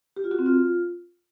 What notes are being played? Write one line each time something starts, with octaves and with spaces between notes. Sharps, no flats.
G4
F4
F#4
C4
F4